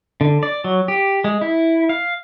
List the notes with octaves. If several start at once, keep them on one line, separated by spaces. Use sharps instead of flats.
D3
D5
F#3
G4
G#3
E4
F5